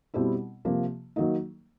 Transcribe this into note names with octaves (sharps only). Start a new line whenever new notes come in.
B2 G3 C4 E4
C3 F3 A#3
D#3 F#3 A#3 D#4